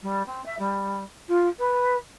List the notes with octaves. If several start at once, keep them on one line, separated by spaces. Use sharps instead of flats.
G3
C4
E5
G3
F4
B4